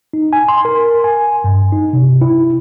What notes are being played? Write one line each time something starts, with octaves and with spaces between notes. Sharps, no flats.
D#4
G#5
C6
A#4
G#5
G2
D#4
C3
E4